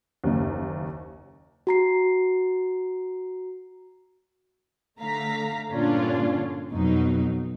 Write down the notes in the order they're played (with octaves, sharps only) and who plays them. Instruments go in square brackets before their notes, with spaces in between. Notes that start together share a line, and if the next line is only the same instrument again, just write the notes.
[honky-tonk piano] F#1 D#2
[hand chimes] F#4 A#5 C7
[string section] D3 A3 F5 A#5 B6
G2 A#2 D3 C#4 D4 F4
F2 B2 F#3 D#4